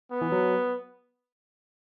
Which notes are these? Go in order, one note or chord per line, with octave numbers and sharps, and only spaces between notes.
B3
E3
F#3